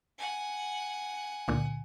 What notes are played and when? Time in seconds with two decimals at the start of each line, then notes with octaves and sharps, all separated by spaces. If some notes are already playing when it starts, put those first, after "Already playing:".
0.19 F#5 G#5
1.48 C#2 A#2 D3